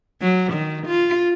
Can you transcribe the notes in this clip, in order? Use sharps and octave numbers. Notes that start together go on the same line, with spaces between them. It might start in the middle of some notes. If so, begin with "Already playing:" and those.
F#3
D#3
F4